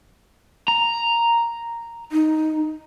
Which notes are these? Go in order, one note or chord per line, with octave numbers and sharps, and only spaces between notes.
A#5
D#4